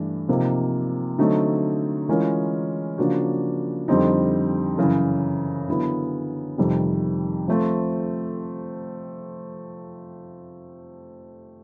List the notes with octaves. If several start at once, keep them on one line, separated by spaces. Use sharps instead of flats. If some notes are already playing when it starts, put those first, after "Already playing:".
Already playing: G2 E3 A3 D4
C3 F3 A#3 D#4
D3 F#3 A3 C4 D#4
E3 G#3 C#4 F4 A#4
C#3 F3 A#3 D4 F#4
F2 D3 G3 C4 D#4
F#2 C#3 E3
D3 F#3 B3 E4
F2 C3 D#3 G3
F3 A3 C4